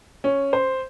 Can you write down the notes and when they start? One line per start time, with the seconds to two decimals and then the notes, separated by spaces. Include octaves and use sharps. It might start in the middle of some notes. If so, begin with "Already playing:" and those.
0.24 C#4
0.53 C5